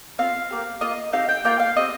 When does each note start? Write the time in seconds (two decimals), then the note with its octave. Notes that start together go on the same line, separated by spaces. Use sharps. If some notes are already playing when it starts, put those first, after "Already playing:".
0.19 C4 F4 F5
0.51 A#3 G4
0.81 A#3 F4 D#5
1.12 C4 D#4 G4 F5
1.29 G5
1.45 A#3 F4 G5
1.60 F5
1.76 C4 G4 D#5